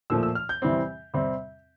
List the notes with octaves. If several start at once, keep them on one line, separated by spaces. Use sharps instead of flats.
A#2 F3 A3 E6
E6
F6
G6
C3 E3 G3 C4
C3 G3 C4